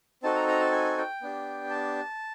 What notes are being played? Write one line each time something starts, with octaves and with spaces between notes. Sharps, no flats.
C4 D#4 F#4 A4 A5
A#5
A#5
A5
G#5
G5
B3 D4 G4
A5